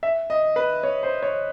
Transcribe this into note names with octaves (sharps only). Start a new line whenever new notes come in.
E5
D#5
B4
C#5
C5
C#5